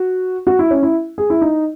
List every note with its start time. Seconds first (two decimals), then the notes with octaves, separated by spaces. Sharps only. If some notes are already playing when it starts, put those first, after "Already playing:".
Already playing: F#4
0.47 F#4
0.59 E4
0.71 C#4
0.83 E4
1.18 G#4
1.30 E4
1.41 D#4